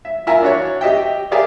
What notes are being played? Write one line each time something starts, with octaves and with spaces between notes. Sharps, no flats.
E5
E4 F4 A#4 E5 G#5 A#5
D4 F#4 C#5
G4 D#5 E5 G5
G4 G#4 A#4 D5 E5 F5